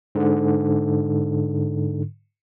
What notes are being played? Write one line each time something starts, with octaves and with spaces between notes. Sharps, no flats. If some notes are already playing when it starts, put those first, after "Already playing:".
G#2 D3